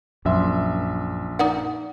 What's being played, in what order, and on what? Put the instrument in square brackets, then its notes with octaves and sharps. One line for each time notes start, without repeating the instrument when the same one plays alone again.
[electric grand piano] A#1 E5 C6 [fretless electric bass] F#2
[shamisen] D#4 D5 F#5